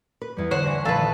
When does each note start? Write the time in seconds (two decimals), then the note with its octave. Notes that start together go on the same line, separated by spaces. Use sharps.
0.22 B4
0.37 E2 G3
0.51 D3 C5 C#5 F#5
0.63 G2 E3 C#6 A#6 B6
0.85 A#1 A4 B4 F5
1.00 D#3